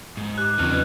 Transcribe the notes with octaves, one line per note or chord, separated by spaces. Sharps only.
G#2
G4 D6 F#6
E2 C#3 C4 D#4 F4 F6
F#3 B4